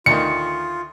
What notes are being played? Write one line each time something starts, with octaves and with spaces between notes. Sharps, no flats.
D2 D#3 F4 C#7